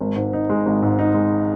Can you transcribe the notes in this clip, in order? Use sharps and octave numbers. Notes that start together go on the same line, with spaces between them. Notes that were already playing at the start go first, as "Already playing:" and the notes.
G#1
G#2
D#4
G#3
G#1
G#2
D#4
G#3